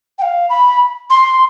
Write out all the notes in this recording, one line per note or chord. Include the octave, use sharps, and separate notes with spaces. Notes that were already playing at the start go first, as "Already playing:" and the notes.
G5
F5
B5
C6